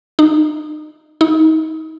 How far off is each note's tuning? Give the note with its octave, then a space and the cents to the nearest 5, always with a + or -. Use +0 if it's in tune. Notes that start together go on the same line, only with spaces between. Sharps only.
D#4 -35
D#4 +30